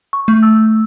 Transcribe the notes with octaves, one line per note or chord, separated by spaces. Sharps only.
C#6
A3
E6